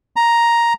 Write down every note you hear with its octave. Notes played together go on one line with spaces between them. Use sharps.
A#5